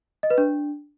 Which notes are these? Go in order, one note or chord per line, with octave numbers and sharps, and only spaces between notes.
D#5
B4
D4